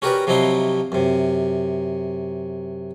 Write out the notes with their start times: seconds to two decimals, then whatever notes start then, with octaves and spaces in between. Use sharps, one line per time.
0.02 C#4 F#4 G4 A#4 B4 D5
0.27 C3 F3 F#3 D#4 E4 C6
0.92 F#2 C3